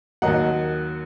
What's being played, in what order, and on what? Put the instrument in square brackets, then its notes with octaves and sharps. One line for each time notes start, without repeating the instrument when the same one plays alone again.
[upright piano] D#2 D#3 F#3 D#5 F#5